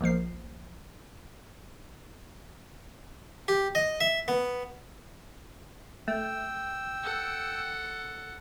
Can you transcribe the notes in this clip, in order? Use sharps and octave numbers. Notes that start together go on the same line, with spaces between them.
A#1 D#2 F3 C7
G4
D#5
E5
B3
A3 G5 E6
A4 F#5